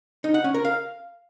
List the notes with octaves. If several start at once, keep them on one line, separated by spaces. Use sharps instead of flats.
D#4
F#5
C#4
A#4
F5